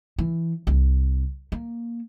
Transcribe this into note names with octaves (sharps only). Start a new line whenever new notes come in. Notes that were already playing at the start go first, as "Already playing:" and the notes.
E3
C2
A#3